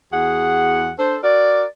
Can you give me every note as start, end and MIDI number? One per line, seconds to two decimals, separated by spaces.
0.13 0.91 40
0.13 0.91 66
0.13 0.91 68
0.13 0.91 78
0.99 1.18 62
0.99 1.18 69
0.99 1.18 72
1.23 1.65 66
1.23 1.65 70
1.23 1.65 74